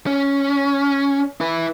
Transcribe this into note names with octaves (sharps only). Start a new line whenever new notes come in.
C#4
E4 B4